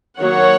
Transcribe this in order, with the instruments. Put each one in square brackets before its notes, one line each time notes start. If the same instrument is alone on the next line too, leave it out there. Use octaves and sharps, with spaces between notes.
[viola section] D#3 F#3 A#3 C#5 F#5